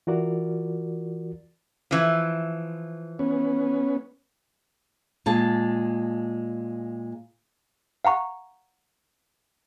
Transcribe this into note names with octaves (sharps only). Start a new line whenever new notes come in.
E3 F4 F#4 A#4 D5
E3 F3
B3 C#4
A#2 G#3 A5
F5 F#5 A#5 C#6